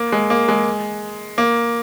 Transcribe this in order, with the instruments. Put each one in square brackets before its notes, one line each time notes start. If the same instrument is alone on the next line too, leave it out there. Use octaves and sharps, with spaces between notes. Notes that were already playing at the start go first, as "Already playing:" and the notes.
Already playing: [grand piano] A#3
G#3
A#3
G#3
A#3